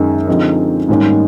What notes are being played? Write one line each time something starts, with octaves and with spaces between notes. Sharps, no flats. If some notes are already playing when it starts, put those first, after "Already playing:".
Already playing: F#2 D#3 G#3
D3 F3 G#3 C4 D#4
G#2 D#3 G3 A#3 C#4